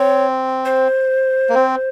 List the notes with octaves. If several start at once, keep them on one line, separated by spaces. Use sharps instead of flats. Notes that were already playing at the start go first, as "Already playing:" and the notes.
Already playing: C4 C#5
C5
A#3
C4